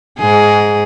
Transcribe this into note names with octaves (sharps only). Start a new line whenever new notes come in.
G#2 G#4